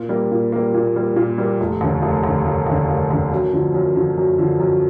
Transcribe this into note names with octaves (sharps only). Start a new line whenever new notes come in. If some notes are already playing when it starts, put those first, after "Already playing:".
Already playing: A#2
G3 A#3
A#2
G3 A#3
A#2
G3 A#3
A#2
G3 A#3
F1
D#2 D3
F1
D#2 D3
F1
D#2 D3
F1
D#2 D3
F#2
D3 F3
F#2
D3 F3
F#2
D3 F3
F#2